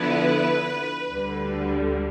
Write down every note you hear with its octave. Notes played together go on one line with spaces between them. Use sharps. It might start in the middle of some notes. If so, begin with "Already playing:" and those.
Already playing: D3 F3 B3 E4 B4
D2 D3 G3